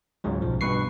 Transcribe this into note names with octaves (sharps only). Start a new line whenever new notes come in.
C#2 G#2 C#3 F#3
B1 F3
G2 B2 B4 C#6 C7